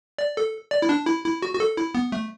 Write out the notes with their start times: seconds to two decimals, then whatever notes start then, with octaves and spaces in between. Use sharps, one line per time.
0.18 D5
0.37 A4
0.71 D5
0.82 E4
0.89 D4
1.06 E4
1.25 E4
1.42 F#4
1.55 F#4
1.60 A4
1.77 E4
1.95 B3
2.12 A3